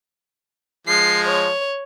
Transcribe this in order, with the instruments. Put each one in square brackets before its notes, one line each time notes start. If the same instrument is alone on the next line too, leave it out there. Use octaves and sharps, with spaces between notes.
[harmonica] F3 G#3 [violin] C7
[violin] C#5